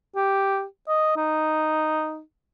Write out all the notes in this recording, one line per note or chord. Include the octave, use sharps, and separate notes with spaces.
G4
D#5
D#4